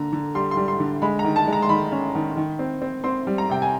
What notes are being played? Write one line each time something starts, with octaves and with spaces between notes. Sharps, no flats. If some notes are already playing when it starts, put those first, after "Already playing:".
Already playing: D3 A#3 A#5
D3
G3 C6
C6
G3
C6
D3
G#3 B5
A#5
D#3
A5
G#3
A#5
C6
D#3 B5
C#4
D#3
D#3
C4
C4
C4 C6
G3
A#5
C3 G5
G#5